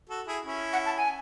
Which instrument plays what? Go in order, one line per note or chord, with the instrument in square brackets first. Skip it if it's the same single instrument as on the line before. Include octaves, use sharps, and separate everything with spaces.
[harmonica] F#4 A4
E4 G#4
C#4 E4
[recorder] F#5
A5
G#5